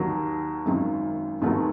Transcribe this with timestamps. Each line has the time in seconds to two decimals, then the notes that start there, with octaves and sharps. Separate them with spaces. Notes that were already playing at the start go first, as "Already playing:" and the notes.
Already playing: D#2 D#3 F#3
0.66 G#1 F#2 D#3
1.41 F1 D#2 D#3 F#3 A3